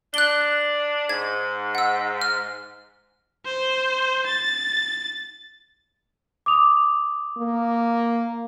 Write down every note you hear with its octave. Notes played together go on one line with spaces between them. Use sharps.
D4 F#6 G7
G#2 G#6
F#5 E6
F6
C5
A6
D6 D#6 F7
A#3